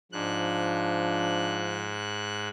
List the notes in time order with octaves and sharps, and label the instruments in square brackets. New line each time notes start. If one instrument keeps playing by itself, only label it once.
[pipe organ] G#2 F#6 [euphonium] F3 [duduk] D4